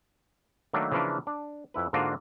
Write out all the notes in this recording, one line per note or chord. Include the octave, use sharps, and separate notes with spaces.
D#3 F#3 A3 A#3 D4 B4
C#3 E3 F3 A#3 C#4 D4
D4
F2 E4 B4
G#2 D3 A#3 D4 F4 F#4